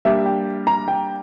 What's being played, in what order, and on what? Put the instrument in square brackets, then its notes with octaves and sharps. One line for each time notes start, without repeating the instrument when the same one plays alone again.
[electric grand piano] G3 A#3 D4 G4 [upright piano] E5
[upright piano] G5
A#5
G5